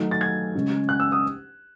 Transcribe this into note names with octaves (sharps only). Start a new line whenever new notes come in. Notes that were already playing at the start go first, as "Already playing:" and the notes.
Already playing: D#3 F#3 A3 D#4
A6
G#6
C#3 G#3 C#4
F#6
E6
D#6